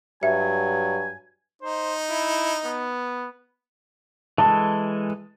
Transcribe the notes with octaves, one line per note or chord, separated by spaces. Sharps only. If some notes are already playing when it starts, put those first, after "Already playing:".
G2 F#3 E5 G#5
D#4 C5
E4
B3
E3 G#3 A4 A5